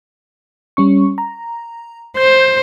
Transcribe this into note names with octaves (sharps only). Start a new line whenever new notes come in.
G3 C#4 C#6
A#5
C5 G6